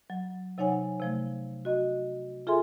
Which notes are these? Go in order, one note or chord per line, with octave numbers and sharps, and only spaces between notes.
F#3
C3 F#3 D#4 C#5 F#5 G#5
C3 F3 A3
F#4 D#5
F4 G#4 A4 E5 G#5 C6